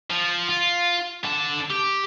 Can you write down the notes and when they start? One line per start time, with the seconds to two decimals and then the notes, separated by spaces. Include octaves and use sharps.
0.10 F3
0.49 F4
1.24 D3 A5
1.70 G4